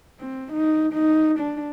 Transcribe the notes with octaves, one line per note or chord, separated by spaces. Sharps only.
C4
D#4
D#4
D4